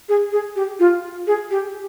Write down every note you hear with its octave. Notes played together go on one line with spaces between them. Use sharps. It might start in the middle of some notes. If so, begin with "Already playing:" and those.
G#4
G#4
G4
F4
G#4
G4